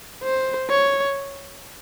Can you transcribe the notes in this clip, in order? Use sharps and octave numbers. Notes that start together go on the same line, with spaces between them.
C5
C#5